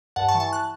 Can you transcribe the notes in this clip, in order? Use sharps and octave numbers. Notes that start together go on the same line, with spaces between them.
G2 F#5 A5
A5 C#6
E3
A5 C#6
F#6